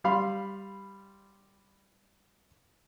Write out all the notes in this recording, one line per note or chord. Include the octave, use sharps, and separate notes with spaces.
G3 F5 B5 C6